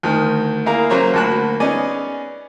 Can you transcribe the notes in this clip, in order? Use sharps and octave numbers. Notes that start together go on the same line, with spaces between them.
D2 D#3
A#3 E4 G#4 A#4 F5 A#5
C#3 F#3 A#3 C5 C#5 A#5
D2 A#3 F#4 A5 B5 F#6
B3 C#4 D#4 G#4 D5 G#5